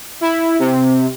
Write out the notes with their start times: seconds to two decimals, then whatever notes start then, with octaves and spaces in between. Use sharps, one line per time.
0.21 E4
0.59 C3